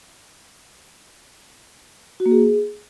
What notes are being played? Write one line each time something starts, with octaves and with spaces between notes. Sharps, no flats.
F#4
A#3
G#4